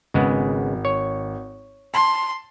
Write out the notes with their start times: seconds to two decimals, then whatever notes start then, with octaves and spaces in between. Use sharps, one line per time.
0.14 G#1 C#3 G#3 B3
0.85 C#5
1.94 A5 C6